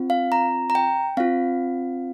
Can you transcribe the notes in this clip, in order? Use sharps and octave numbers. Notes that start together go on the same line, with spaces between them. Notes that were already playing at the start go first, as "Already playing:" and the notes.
Already playing: C4 F4
F5
A#5
A#5
G5
C4 F4 F5